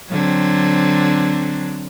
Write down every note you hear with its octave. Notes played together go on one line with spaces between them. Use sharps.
D3 F#3 C4